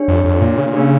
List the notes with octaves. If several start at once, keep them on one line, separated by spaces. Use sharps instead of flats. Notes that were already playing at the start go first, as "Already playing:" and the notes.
Already playing: D4 G4 C#5
F2
F2
A#2
C#3
A#2
C#3 A#3 D4 G4